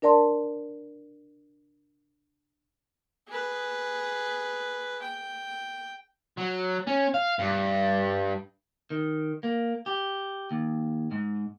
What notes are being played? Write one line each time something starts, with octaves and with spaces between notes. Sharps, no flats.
D4 A#4 D5 A5 C6
G#4 B4
G5
F#3
C#4
F5
G2
D#3
A#3
G4
D#2
G#2